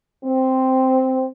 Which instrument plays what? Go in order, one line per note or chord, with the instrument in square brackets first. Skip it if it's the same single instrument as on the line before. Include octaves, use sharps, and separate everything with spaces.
[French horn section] C4